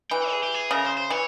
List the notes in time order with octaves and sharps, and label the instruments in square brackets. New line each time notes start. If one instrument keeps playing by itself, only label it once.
[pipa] E3 [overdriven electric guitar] G5
[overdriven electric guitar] G#4
G4
G#4
[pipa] C#3 [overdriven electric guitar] A#4
[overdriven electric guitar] C5
C5
[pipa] E3 [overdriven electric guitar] C#5